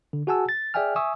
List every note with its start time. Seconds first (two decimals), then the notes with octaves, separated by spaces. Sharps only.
0.13 D3
0.27 F#4 G#4 F#5 G#5 A5 E6
0.49 A6
0.74 G#4 D5 E5 G5 G#5 F6
0.96 E5 G#5 C#6 D#6 E6